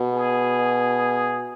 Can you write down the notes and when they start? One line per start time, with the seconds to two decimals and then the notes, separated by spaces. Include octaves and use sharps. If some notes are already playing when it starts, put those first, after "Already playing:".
Already playing: B2
0.13 G#4